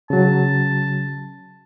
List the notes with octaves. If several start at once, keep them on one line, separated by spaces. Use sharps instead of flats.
C#3 F#3 A5